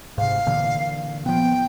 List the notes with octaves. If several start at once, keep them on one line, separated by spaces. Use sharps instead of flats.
G#2 C3 F5
A#2 D3 E3
F3 B3 G5